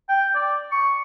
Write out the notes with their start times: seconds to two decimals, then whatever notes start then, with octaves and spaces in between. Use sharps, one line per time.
0.09 G5
0.35 D5
0.72 C#6